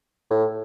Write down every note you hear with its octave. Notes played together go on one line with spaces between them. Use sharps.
A2